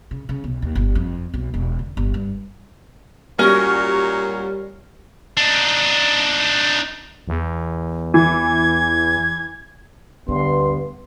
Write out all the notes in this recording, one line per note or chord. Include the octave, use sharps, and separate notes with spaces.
C#3
C#3
B1
D#2
G1
F2
B1
E1
D3
G1
G2
F#2 A#2 G3 C#4 F#4 A#4 C#5
D4 D#4
E2
E3 G#6
D2 G2 B3 C6